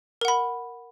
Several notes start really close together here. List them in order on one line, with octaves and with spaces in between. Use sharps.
A#4 F#5 B5